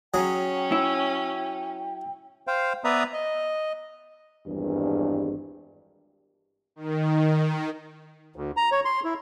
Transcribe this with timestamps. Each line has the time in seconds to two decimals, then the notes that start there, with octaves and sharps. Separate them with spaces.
0.14 F#3 C#4 G#4 G5
0.72 E4
2.47 C5 F5 G5
2.84 B3 B4 D5 E5 A#5 D#6
3.13 D#5
4.45 G#1 E2 G2
6.76 D#3
8.36 D2
8.57 A#5
8.72 C#5
8.85 C6
9.04 E4